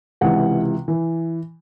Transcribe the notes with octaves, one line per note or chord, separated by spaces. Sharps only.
C#2 C3 E3 F#5
E3